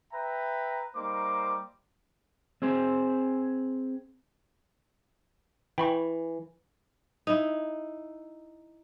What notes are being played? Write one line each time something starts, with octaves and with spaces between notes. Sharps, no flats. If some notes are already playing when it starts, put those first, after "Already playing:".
B4 E5 G5 A#5
G3 A#3 D#4 C5 D6
C4 G#4 C5
E3 G5 B5 C#6
D#4 E4